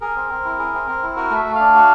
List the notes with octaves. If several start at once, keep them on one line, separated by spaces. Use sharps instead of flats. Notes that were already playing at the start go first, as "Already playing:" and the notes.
G#4 A#4
C4
C4
E4
G#4
C4
C4
E4
F#4 A#4
A3 E5
A3
D4 F5
F#4